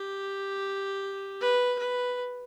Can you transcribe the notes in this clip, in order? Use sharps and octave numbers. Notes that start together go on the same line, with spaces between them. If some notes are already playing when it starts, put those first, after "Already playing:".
Already playing: G4
B4
B4